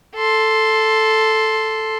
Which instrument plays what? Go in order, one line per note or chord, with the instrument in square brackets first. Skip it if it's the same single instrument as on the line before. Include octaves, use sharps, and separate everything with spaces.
[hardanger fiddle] A4 C6